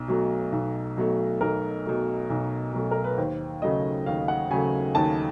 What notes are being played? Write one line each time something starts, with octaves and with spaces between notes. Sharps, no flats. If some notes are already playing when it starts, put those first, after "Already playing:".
Already playing: B1
B2 F#3 A3
B1
B2 F#3 A3
B1 A#4
B2 F#3 A3
B1
B2 F#3 A3
A#4
B4
D#2 C5
C#3 F#3 A3 D#5
D#2 F5
F#5
C#3 F#3 A3 G#5
D#2 A5